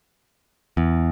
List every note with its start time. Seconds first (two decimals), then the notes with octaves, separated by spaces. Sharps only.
0.77 E2